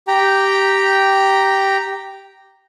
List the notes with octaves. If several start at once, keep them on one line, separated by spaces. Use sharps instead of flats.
G4 G5 A#5